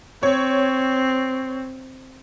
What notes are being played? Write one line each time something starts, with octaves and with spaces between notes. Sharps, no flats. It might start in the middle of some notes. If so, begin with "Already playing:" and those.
C4 C#5